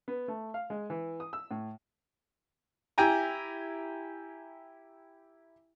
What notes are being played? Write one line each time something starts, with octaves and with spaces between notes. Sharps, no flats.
B3
A3
F5
G#3
E3
D#6
E6
A2
E4 G4 G5 G#5 A#5